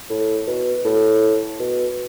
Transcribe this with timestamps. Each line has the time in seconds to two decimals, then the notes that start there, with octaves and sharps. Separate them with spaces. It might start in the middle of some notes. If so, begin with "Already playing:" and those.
0.10 A2
0.47 B2
0.85 A2
1.59 B2